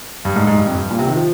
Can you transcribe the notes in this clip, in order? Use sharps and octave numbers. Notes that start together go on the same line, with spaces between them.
G2
G#2
G#2
G2
F2
G2
A#2
C3
D#3
F3